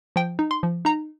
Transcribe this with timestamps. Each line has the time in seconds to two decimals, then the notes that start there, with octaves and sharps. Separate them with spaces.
0.16 F3 G5
0.39 D#4
0.51 C6
0.63 F3
0.85 D#4 A#5